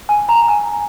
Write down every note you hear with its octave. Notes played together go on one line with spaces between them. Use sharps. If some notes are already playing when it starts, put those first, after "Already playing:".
G#5
A#5
G#5